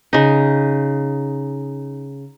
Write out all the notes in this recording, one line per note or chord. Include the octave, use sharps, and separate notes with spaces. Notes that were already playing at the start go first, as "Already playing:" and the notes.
C#3 D#4